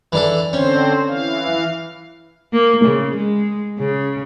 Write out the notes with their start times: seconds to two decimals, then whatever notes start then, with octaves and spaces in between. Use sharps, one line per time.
0.12 E3 D4 A4
0.53 D3 C4 C#4 C5
1.07 E3 F5
2.53 A#3
2.85 C#3
3.16 G#3
3.79 C#3